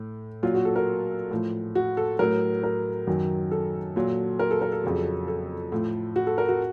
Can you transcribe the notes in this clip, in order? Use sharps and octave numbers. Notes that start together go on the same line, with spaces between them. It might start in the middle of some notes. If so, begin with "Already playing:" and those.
Already playing: A2
A#2 F#3 F4
F#4
A4
A#4
A2 F3
F#4
A4
A2 F#3 A#4
A#4
F#2 D#3 F#3
A4
A#2 F#3
A#4
A4
A#4
A4
F2 C#3 F#3
A4
A2 F3
F#4
A4
A#4
F#4